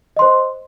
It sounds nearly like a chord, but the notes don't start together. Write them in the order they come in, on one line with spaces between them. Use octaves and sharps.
D#5 C6 C5